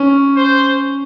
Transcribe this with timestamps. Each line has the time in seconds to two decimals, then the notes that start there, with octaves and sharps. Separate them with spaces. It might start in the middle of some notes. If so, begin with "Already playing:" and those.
Already playing: C#4
0.37 C5